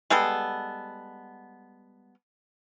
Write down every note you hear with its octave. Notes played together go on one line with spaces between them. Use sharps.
G3 G#3 B3 A4